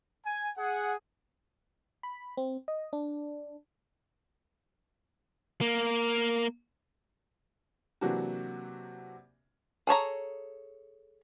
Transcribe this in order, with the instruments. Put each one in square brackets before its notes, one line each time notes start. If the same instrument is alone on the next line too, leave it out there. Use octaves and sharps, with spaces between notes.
[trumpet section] G#5
G#4 F#5
[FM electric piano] B5
C4
D#5
D4
[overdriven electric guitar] A#3
[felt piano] C3 E3 F#3 A#3 D4 F#4
[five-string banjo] G#4 A4 C#5 A#5